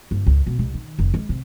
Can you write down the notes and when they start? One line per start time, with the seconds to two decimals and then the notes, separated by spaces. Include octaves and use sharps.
0.11 G1
0.27 C#2
0.47 B2
0.59 C2
0.74 D#3
0.99 F1
1.14 G#3
1.29 C3